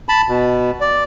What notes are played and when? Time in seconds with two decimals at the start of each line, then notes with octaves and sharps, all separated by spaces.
0.09 A5 B5
0.29 B2
0.81 D5